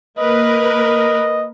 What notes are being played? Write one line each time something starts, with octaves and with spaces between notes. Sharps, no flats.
A#3 A#4 B4 D#5